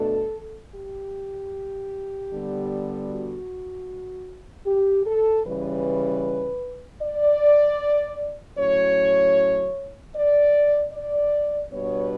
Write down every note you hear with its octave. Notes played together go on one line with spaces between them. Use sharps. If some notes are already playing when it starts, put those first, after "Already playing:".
Already playing: B2 A3 D4 A4
G4
D3 G3 B3
F#4
G4
A4
C#3 E3 G3 C#4 B4
D5
A2 F#3 C#4 C#5
D5
D5
B2 G3 B3 D4 C#5